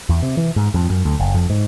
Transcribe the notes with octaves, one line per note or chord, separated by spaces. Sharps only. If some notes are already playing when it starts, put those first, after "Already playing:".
E2
C3
E3
G#2
F2
F#2
D2
F#1
F2
G#2